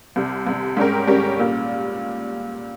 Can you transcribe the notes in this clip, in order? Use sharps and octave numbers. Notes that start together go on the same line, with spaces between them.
C2 C3 G3
C2 C3 G3
G#2 G3 C#4 G4 A#4
G#2 G3 C#4 G4 A#4
A#2 G3